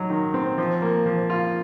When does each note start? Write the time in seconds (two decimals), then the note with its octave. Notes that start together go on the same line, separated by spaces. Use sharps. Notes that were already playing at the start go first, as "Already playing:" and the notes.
Already playing: F#3 D#4
0.10 D#3
0.34 C4
0.58 F3
0.82 A#3
1.06 F3
1.30 F4